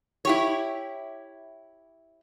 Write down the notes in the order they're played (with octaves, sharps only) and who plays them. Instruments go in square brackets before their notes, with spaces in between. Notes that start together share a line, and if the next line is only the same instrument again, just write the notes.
[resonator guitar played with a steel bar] E4 G4 C#5